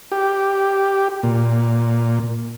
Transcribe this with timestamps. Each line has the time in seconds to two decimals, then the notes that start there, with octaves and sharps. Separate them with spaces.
0.12 G4
1.23 A#2